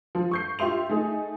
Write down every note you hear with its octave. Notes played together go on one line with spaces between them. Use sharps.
F3
C#6 G6 C7
F4 G4 E5 C6 F7
A3 D#4 G#4